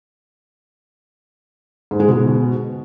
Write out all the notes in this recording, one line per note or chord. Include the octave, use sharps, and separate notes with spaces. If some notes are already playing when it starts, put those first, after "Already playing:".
G#2
G#3
B2